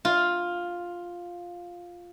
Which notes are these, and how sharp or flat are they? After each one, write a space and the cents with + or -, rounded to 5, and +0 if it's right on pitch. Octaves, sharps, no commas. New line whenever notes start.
F4 +5